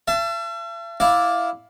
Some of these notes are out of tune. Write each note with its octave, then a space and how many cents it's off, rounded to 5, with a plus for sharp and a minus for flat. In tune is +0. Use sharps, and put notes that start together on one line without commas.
E5 +45 A5 +0
E4 +0 D5 +0 F5 +15